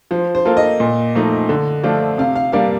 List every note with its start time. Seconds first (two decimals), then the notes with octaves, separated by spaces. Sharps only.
0.11 F3 C5
0.35 C5
0.45 A#3 F4 A4
0.57 D#5
0.80 A#2
1.15 F3 A3 D#4
1.49 D3
1.84 F3 A3 D4 F4
2.18 C3 F5
2.36 F5
2.52 G3 A#3 D4 F5